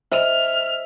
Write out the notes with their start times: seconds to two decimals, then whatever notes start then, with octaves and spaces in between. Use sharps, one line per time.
0.12 C5 D#5 E5 F6